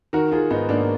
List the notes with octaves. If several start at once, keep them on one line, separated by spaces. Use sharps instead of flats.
D#3 F#4 A#4
D#3 F4 G#4
G#2 B3 D#4
G#2 A#3 D4